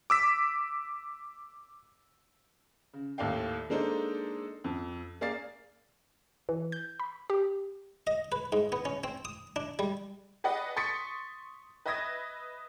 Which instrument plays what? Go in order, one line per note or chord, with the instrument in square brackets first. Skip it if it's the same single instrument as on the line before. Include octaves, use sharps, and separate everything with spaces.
[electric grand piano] D6 E6 B6
[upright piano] C#3
D#2 A2 A4 D5 F5 G5
G#3 A#3 D4 D#4 A4 C5
F2
A#3 G#4 D5 F5 A6 C7
[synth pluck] E3
G6
B5
G4
[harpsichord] D#5
B4
G#2
B3
C#4
C4
D#6
D4
G3
[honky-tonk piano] G#4 B4 D5 D#5 F#5
C6 C#6 D#6 A6 B6 C#7
B4 D#5 E5 D#6 G#6 A#6